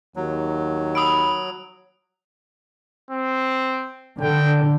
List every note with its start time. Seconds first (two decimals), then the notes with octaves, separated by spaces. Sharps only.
0.16 D#2 F#3
0.95 B5 D#6 E6 D7
3.11 C4
4.21 D3 G5